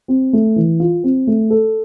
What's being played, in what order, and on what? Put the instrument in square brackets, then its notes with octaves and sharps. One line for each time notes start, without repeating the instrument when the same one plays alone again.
[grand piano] C4
A3
E3
F4
C4
A3
A4